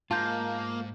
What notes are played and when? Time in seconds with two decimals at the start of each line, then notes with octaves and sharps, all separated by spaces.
0.11 G#2 A#3 F4 A5 G6